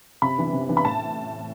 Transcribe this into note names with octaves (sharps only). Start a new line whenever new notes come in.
C3 B5
E3 B3 D4
C3
E3 B3 D4
B5
A2 A5